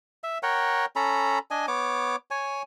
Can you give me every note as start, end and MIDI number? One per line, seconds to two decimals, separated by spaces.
0.24 0.38 76
0.43 0.85 70
0.43 0.85 73
0.43 0.85 78
0.43 0.85 79
0.96 1.39 61
0.96 1.39 69
0.96 1.39 82
0.96 1.39 83
1.51 1.66 62
1.51 1.66 75
1.51 1.66 80
1.68 2.16 59
1.68 2.16 73
1.68 2.16 86
2.31 2.62 73
2.31 2.62 80